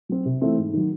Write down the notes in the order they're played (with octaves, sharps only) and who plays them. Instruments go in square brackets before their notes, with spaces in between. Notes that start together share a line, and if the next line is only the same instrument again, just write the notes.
[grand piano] F#3 C4
C3
E3 A3 C4 E4
G#2
D#3 F#3